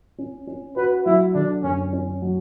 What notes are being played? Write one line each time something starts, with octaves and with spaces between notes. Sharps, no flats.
C#4
C#4
F#4 B4
F#3 E4
D3 D4
F#2 C#4
C#4
F#3